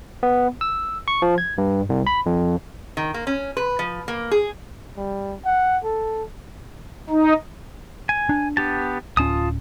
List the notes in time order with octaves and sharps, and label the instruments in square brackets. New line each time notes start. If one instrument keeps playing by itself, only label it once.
[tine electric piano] B3
E6
C#6
F3
G#6
G2
C2
B5
F2
[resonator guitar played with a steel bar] D#3
A#3
C#4
B4
F3
A#3
G#4
[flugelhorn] G3
F#5
A4
[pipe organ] D#4
[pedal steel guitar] G#5
[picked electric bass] D4
[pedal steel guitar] B3 G4 A5
[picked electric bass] D1 C#4 [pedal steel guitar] F4 A5 D#6